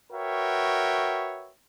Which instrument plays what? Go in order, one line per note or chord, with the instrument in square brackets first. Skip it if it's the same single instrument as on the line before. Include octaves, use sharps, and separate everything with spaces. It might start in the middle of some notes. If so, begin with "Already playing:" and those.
[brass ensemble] F#4 A#4 B4 C#5 E5 G5